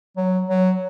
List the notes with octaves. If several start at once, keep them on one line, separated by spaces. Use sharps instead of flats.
F#3
F#3